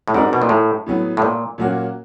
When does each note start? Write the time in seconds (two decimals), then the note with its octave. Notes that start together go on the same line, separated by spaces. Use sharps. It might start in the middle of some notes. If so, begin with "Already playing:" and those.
0.08 A2
0.14 G#2 C4 D#4 F#4 A#4 D5
0.33 B2
0.42 A#2
0.49 A2
0.86 A2 F#3 B3
1.17 A2
1.22 A#2
1.58 A#2 F#3 A#3 C#4 F#4